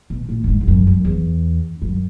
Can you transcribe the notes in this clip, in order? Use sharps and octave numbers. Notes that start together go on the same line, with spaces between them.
B2
A#2
A#2
G#2
E2
F#2
F#2
E2
F#2